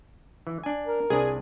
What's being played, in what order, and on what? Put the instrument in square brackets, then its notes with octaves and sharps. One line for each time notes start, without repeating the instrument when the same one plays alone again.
[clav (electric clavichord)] E3
D4 G#5
[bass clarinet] A#4
[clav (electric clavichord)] C2 D4 [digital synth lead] G#4